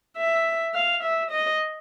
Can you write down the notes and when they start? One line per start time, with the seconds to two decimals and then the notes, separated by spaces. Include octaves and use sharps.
0.17 E5
0.75 F5
1.03 E5
1.31 D#5